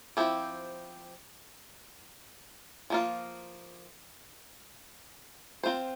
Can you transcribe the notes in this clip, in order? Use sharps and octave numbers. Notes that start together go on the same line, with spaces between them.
F3 C4 E4 G4
F3 A#3 F4
C4 F4 C5